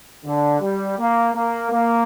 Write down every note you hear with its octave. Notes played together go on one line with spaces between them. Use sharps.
D3
G3
A#3
A#3
A#3